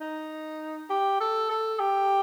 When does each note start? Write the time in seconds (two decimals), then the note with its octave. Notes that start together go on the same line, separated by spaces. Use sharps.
0.01 D#4
0.90 G4
1.20 A4
1.50 A4
1.80 G4